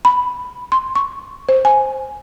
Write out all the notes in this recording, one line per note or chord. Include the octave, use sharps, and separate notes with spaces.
B5
C6
C#6
C5
G#5